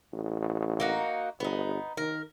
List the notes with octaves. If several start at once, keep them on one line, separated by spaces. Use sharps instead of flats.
A1
A#3 D#4 F#4
G1 B3 D#4
D#3 A#4